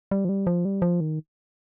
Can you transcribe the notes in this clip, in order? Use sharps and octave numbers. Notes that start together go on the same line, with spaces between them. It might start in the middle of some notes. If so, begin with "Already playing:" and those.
G3
F3
G3
F3
G3
F3
D#3